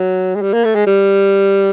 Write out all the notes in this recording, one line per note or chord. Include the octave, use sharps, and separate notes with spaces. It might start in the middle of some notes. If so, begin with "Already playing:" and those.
Already playing: F#3
G#3
G3
A#3
A3
G#3
G3